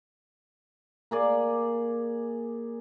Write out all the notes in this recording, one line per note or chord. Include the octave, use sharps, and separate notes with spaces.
A#3 G#4 D5